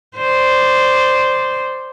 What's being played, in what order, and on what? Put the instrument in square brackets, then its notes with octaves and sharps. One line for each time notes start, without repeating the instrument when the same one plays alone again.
[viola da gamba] C5 D5